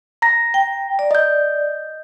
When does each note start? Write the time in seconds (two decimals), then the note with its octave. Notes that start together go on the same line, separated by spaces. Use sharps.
0.22 A#5 A#6
0.54 G5
0.99 D5
1.11 D#5 G6